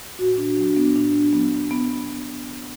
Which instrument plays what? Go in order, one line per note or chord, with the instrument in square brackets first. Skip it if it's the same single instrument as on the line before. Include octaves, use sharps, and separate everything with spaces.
[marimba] A#2 F#4
A#2 D4
F#3 D4
F#3 B3
A#2 D4
A#2
F#3 B3
F#3
B3